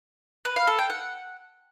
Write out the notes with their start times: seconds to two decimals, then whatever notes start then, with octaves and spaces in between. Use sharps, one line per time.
0.45 B4
0.56 F5
0.67 A4
0.79 G5
0.90 F#5